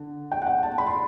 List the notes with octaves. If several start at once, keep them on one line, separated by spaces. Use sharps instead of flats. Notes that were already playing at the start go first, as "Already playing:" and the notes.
Already playing: D3
G5
F#5
G5
A5
B5
C6